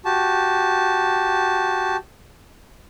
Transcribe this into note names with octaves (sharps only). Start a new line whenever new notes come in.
F#4 G4 A5